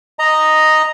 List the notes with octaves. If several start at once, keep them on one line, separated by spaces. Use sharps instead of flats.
D#5 A#5